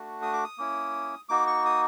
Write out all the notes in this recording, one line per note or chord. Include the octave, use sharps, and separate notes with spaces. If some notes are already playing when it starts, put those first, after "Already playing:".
Already playing: A3 D4 F#4
D#6
D6
D#6
A#3 C#4 E4
A#3 D#4 F#4 D6
C#6
D#6